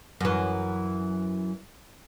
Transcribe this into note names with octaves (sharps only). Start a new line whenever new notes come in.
F#2 E3